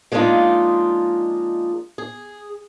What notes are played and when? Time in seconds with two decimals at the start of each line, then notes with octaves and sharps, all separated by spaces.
0.12 F3 G#3 A#3 D4 D#4 F4
1.98 G#4